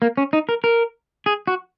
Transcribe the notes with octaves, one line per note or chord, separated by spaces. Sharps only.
A#3
C#4
D#4
A#4
A#4
G#4
F#4